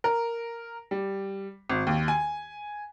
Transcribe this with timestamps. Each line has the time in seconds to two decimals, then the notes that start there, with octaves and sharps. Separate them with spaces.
0.04 A#4
0.91 G3
1.70 G#1
1.87 D#2
2.08 G#5